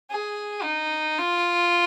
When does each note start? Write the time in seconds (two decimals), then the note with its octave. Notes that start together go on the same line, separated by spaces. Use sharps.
0.10 G#4
0.63 D#4
1.18 F4